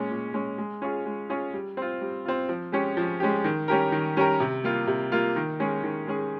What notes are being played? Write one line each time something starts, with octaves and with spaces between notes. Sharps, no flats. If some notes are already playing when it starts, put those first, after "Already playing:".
Already playing: A#2 G#3 C#4
A#2
G#3 C#4
G#3
C#4 F4 G#4
G#3
C#4 F4 G#4
G3
C4 F4
G3
C4 F4
F3
G#3 C#4 G4
F3
G#3 C#4 G4
D#3
G3 C#4 G4 A#4
D#3
G3 C#4 G4 A#4
C3
G3 A#3 F4
C3
G3 A#3 F4
D#3
G#3 C#4 G#4
D#3
G#3 C#4 G#4